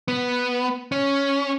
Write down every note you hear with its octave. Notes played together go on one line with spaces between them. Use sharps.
B3
C#4